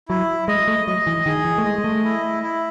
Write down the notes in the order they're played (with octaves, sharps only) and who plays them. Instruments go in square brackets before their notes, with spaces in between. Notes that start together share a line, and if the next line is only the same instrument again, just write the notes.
[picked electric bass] F#3 [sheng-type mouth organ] E4
[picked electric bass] G#3 [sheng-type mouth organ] D#5
[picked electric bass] A3
[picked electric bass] F#3 [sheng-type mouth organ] D#5
[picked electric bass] E3
[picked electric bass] D#3 [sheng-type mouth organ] G#4
[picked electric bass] E3
A3
[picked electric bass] G#3 [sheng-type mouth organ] D#5
[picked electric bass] G#3
A3
[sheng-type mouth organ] E4
E4